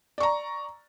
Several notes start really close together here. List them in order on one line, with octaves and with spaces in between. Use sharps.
D5 C#6 A#5